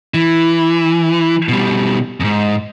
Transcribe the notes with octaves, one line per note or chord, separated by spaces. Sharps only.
E3
B2 G3
F2 G#2